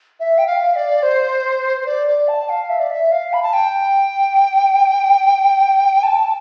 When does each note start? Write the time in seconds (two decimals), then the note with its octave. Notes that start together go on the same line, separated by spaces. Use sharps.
0.20 E5
0.38 G5
0.47 F5
0.76 D5
1.03 C5
1.81 C5
1.86 D5
2.07 D5
2.28 A5
2.49 F5
2.69 E5
2.79 D5
2.90 E5
3.12 F5
3.33 B5
3.43 A5
3.53 G5
6.03 A5